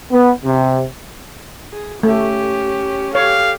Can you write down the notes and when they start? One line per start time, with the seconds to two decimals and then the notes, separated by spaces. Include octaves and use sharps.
0.11 B3
0.44 C3
1.72 G#4
2.03 A3 C#4 G4
3.15 G4 A4 C#5 F5